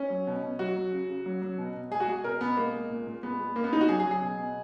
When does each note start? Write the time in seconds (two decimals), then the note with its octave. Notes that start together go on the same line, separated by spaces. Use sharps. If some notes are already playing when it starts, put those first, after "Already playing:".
Already playing: C#4
0.10 F#3
0.27 B2
0.43 B2
0.59 F#3 F#4
0.76 F#3
0.92 C#3
1.09 C#3
1.26 F#3
1.42 F#3
1.58 B2
1.75 B2
1.91 G#3 G#4
2.00 F#4
2.08 G#3 G#4
2.24 B2 A#4
2.41 B2 B3
2.57 G#3 A#3
2.74 G#3
2.90 A#2
3.07 A#2
3.23 G#3 B3
3.40 G#3
3.56 C#3 A#3
3.64 B3
3.73 C#3 D#4
3.81 F#4
3.89 F#3 G#4
4.00 G#4
4.05 F#3
4.11 G#4
4.22 B2
4.39 B2